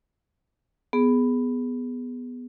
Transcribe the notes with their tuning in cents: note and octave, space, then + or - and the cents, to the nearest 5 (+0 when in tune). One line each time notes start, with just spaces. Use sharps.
B3 +0 G#4 +0